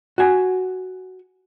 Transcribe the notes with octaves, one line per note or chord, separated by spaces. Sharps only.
F#4 G#5